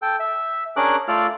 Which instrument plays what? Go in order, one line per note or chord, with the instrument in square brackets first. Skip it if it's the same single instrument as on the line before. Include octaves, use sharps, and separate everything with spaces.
[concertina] A4 G5
E5
C#4 D4 G#4 A#4 D6 F#6
A3 F4 A4 D5 F6